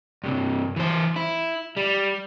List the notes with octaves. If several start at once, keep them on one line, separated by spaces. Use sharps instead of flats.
G2 C3
E3 C5
E4
G3